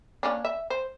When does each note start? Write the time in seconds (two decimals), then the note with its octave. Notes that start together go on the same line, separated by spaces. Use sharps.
0.23 A#3 C#4 D4
0.45 E5
0.70 C5